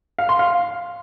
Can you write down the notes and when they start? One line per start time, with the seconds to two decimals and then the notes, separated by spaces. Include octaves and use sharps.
0.19 F5
0.29 C6
0.39 F5